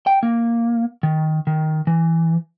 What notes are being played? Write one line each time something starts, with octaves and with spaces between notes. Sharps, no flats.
G5
A#3
D#3
D#3
E3